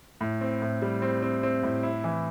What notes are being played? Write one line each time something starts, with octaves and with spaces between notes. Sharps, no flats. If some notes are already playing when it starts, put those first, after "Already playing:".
A2
C4
A2
G3
C4
C4
C4
A2
E4
E3